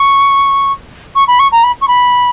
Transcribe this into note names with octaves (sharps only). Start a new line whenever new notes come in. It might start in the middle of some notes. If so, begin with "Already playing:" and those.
Already playing: C#6
C#6
B5
C#6
A#5
B5
C#6
B5